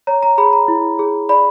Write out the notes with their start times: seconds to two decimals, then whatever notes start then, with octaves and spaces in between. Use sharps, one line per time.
0.07 C#5 A#5
0.23 A#5
0.38 G#4 B5
0.53 A#5
0.68 E4
0.99 G#4
1.29 D5 B5